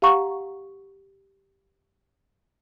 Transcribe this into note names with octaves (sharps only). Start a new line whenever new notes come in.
G4 F5 F#5 A#5 C#6